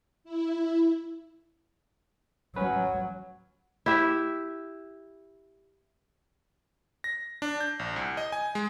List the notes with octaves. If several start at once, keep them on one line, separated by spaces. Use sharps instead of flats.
E4
F#3 C#4 B4
E4 G4 E5
A#6
D4
G6
A#1
C2
D#5
G#5
G#3